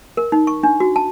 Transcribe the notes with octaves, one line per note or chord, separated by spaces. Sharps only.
A#4
D#4
C#6
D4
F#4
A5